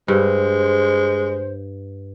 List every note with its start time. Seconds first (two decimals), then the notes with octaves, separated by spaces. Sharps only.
0.08 G2 G#3 C5